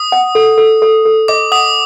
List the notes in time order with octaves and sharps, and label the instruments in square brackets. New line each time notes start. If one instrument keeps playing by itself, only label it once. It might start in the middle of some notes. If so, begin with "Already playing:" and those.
Already playing: [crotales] D#6
[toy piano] F#5
A4
A4
A4
A4
[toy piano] D#5 [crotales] D6
[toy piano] F#5 [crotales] D#6